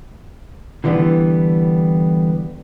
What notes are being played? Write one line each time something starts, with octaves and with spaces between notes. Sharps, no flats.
D3 E3 G3 B3